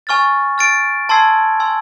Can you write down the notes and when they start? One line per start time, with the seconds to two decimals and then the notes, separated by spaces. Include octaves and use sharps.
0.07 G#5 C#6 F6 A6
0.58 F6 A6 D7
1.09 A5 C6 E6 G#6 C7
1.60 G#5 C6 E6